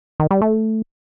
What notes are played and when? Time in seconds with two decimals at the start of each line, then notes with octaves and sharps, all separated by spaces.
0.20 D#3
0.31 G3
0.42 A3